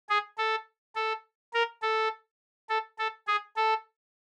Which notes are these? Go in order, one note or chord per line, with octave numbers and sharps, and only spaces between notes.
G#4
A4
A4
A#4
A4
A4
A4
G#4
A4